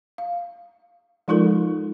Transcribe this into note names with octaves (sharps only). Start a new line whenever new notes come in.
F5
F3 G#3 D#4 F4 A4 A#4